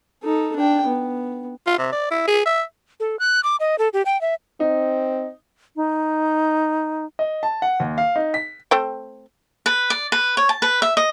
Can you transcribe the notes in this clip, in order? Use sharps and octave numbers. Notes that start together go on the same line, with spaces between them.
D#4 A4
D4 G5
B3
F4
C3
D5
E4
G#4
E5
A4
F#6
D6
D#5
A4
G4
G5
E5
C4 D#4
D#4
D#5
A5
F#5
D#2
F5
D#4
B6
A3 C4 G5
B4
D5
B4
C#5
A5
B4
E5
D#5